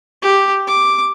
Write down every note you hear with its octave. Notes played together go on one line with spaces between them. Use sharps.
G4
D6